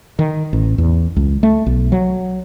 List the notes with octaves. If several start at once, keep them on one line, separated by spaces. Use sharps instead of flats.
D#3
A1
E2
C#2
A3
B1
F#3